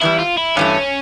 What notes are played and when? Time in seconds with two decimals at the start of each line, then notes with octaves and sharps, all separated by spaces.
0.01 E2 E3 G3 E4
0.19 F4
0.38 E4
0.56 G2 E3 A3 C#4